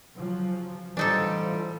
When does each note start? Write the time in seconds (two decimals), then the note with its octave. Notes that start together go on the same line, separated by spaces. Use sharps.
0.15 C#3 F3 F#3
0.97 A2 D3 E3 F3 G3 D4 D#4 A4